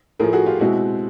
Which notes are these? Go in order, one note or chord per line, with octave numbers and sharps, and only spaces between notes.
A2 F3 A3 G#4 A#4
F#4 G#4
F4 G4
B2 G#3 C4 E4 F#4